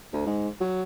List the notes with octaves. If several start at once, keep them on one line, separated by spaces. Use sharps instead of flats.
D2
G#2
F#3